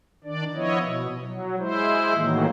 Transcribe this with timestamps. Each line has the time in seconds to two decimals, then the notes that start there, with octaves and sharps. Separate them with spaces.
0.24 D#3 D4 D5
0.54 F3 B3 E4 C#5 D#5
0.84 B2
1.20 F#3
1.59 G#3 E4 C5
2.14 A2 D#3 E3 F#3 A#3